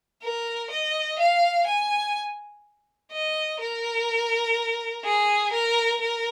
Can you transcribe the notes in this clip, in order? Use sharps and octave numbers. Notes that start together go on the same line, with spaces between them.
A#4
D#5
F5
G#5
D#5
A#4
G#4
A#4
A#4